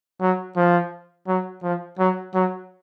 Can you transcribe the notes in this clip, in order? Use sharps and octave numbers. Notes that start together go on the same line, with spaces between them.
F#3
F3
F#3
F3
F#3
F#3